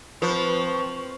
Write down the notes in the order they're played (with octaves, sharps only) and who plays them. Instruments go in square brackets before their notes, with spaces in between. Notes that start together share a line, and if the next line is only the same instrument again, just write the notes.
[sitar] F3 [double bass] C4 [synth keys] B4 [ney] C#6